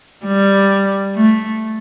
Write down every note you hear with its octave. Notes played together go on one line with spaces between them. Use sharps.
G3
A3